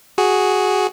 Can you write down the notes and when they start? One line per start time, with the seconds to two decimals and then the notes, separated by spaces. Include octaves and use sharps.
0.18 F#4 G#4